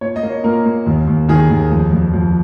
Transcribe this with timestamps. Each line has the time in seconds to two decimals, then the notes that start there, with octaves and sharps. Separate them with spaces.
0.01 A#2 C#5
0.16 D#5
0.23 A#3
0.30 C#5
0.44 A#2 A#4
0.65 A#3
0.86 D#2
1.08 D#2
1.29 D#3 G#4
1.50 D#2
1.71 F2
1.92 F2
2.14 F2